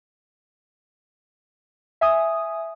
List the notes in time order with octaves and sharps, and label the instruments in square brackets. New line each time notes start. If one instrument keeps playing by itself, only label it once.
[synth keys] E5 G#5 D#6